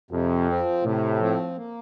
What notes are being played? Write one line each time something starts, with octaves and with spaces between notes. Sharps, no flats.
F2 C3
F3 C4
A2 C3
F3 C4
A#3